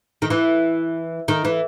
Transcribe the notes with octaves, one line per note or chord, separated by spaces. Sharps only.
D#3
E3
D#3
E3